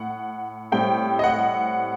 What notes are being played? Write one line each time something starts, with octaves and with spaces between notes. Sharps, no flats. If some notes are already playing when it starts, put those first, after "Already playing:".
Already playing: A2 F#5
A2 G3 C4 G5
D#5
F#5